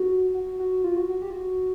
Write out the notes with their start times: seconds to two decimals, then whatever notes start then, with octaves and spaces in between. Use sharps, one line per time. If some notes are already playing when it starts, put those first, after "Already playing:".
Already playing: F#4
0.34 F#4
0.60 F#4
0.84 F4
0.96 F#4
1.10 F#4
1.22 G4
1.30 F4
1.33 F#4